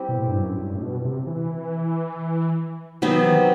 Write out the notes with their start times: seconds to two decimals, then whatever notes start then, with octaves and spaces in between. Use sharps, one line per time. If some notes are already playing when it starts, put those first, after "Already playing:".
Already playing: G3 C4 E4 G4
0.09 B2
0.18 A2
0.28 G2
0.39 F#2
0.60 G2
0.76 A2
0.82 B2
1.05 C3
1.27 E3
3.02 C3 D#3 F#3 B3 D#4
3.16 E3
3.30 D#3